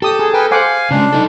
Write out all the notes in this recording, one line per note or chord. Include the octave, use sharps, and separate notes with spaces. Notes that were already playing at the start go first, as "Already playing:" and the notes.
G4 A4 D#6
G#4
A#4 B4 G5 G#5
C5 F5 F#5 G#5 D6
C#3 G#3 D4
D#4 A4